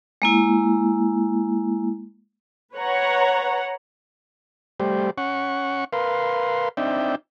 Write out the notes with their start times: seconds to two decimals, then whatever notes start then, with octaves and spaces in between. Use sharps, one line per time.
0.22 G#3 A#3 E4
2.74 B4 C#5 F#5 A#5
4.80 G3 A3 G4 C5 D5
5.18 C#4 F#5 C#6
5.93 A#4 B4 F5 C6
6.77 C4 D4 D#4 D5 E5 G5